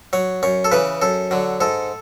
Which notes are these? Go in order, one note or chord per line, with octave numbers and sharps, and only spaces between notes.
F#3 C#5
F#2 C#5
A4
C#3 E3 B4
F#2 A4
D3 F#3
G#2 A4